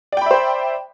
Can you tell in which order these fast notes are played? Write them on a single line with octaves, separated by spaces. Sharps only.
D5 G5 B5 E5 C5